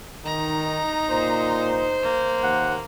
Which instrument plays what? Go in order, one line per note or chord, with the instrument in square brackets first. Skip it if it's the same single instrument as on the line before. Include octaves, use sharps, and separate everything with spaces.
[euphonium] D#3 [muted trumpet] D#4 [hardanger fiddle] A#5
[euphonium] A#2 [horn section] C5
[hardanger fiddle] A#3
[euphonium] D#2 [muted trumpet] F#5